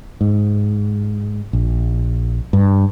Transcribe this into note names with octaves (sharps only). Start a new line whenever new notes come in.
G#2
A#1
G2